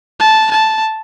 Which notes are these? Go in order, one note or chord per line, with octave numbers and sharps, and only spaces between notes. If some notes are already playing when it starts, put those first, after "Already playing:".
A5
A5